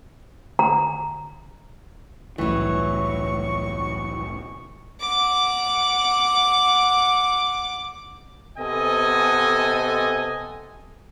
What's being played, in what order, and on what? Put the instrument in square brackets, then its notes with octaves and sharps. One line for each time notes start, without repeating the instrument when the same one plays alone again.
[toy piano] A#5
[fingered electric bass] E1 C2 A2 [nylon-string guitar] E3 F#3 [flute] C#6
[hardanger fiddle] F#5 D6
[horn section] C3 B3 A4 D#5 G#5